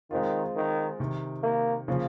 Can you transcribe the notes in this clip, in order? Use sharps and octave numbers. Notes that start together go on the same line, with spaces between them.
D#3 G#3 C4 F4
D#3
C3 D#3 G3
A#3
C#3 F3 A#3 C#4 F4